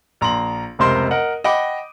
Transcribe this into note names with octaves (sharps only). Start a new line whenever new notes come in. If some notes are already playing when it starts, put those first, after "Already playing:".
A#1 A#5 C6 F#7
F1 C#2 C3 A#4 C5 C6
A#4 D#5 F#5
D#5 F#5 G5 B5 D6